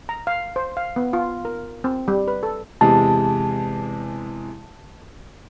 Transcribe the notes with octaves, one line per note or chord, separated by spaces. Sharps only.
A#5
F5
C5
F5
B3
F4
A#4
C4
G3
B4
A4
E2 C3 G#3 A5